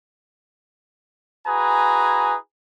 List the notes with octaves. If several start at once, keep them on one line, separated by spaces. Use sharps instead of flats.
E4 F#4 G#4 B4 G#5 A#5